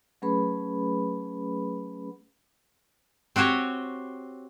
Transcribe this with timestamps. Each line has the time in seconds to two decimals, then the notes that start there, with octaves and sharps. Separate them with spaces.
0.22 F#3 A3 C#4 G#4 B4 B5
3.36 C4 F#4 G4 C5 C#5